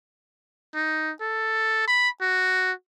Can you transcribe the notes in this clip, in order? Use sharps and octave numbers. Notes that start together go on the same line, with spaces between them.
D#4
A4
B5
F#4